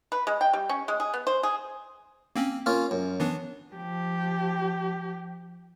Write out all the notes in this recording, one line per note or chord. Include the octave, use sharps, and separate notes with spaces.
B4
G#3
G5
G3
C#4
G#3
G#4
B3
C5
G#4
A#3 C4 C#4
A#3 C#4 F4 F6
F#2
E3 B3 D4
F3 G4